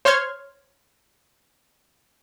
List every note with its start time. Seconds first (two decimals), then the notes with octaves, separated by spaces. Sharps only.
0.05 C5 C#5 C6 F6 G#6